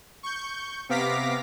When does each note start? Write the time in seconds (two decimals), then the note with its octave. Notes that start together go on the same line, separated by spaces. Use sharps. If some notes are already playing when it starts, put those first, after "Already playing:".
0.23 C#6 G6
0.89 C3 B3 F5 D6 A#6 B6